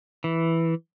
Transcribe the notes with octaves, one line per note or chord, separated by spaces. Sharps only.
E3